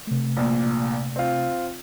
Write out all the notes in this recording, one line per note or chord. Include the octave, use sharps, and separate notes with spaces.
C3 A3
A#1 A#2
C4 F4